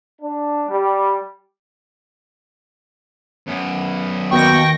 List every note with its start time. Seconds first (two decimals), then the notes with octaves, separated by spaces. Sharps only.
0.21 D4
0.68 G3
3.47 F#2 B3
4.31 D#2 B2 D#3 G5 C#6 A#6